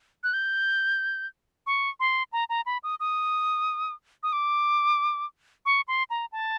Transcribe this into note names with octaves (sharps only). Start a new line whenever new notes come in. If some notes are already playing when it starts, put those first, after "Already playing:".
F#6
G6
C#6
C6
A#5
A#5
B5
D#6
D#6
D#6
D6
C#6
C6
A#5
A5